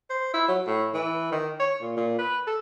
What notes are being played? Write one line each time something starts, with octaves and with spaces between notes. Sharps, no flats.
C5
E4
F#3
A2
E3
D#3
C#5
A#2
A#2
B4
A4